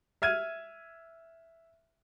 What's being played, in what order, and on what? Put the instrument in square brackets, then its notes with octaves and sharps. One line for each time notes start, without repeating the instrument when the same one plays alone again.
[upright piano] E5 F6 G#6 D#7